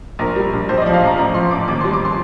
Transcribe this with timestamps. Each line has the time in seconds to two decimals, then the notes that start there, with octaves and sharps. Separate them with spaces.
0.19 A#1 A#4
0.36 G3
0.53 A#1
0.69 A#1 C5
0.78 D#5
0.82 D5
0.86 F3
0.93 F5
1.02 A#1 A#5
1.18 A1 A#5
1.34 F3 C6
1.51 A1 D6
1.68 D#2 D6
1.81 C6
1.85 G3
1.93 D6
2.05 C6